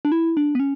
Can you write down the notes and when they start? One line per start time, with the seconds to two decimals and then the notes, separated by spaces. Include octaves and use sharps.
0.05 D4
0.12 E4
0.37 D4
0.55 B3
0.60 C#4